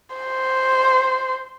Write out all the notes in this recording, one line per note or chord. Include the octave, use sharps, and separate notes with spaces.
C5